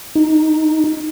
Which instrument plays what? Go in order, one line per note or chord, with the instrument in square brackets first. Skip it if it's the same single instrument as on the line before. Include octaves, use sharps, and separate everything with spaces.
[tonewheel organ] D#4